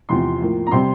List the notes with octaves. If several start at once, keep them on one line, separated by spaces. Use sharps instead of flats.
E2 C3 F3 C6
A2 F3 A#3
A#5
C3 G3 C4 C6